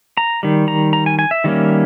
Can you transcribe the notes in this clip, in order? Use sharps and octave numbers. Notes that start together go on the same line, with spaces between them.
A#5
D#3 G3
A#5
A#5
G#5
G#5
E5
D#3 G3 A#3 C#4